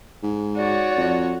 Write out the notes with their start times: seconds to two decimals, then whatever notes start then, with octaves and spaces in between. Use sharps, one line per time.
0.23 G#2
0.56 F#4 C#5 D5
0.97 F2